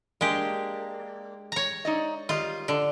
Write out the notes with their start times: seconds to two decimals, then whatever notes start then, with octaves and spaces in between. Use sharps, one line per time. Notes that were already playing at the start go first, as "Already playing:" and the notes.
0.21 G#3 A#3 D4 G4
1.52 C#5 A#5
1.85 D#4 D5 D#5
2.29 D#3 G3 F4 D#5
2.68 D3